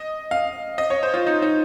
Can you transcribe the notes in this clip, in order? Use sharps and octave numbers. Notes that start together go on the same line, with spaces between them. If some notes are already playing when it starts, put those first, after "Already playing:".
Already playing: D#5
F5
D#5
C#5
C5
F4
D#4
D#4